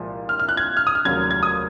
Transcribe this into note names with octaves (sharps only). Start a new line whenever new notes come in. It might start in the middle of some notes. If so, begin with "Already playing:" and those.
Already playing: C2 A#2 F3 G#3
F6
F6
F#6
G#6
F6
D#6
F6
F1 D#2 C#3 F#3 G#6
G#6
D#6